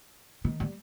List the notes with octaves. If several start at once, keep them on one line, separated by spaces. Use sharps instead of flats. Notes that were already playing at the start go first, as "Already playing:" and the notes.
D#3
G3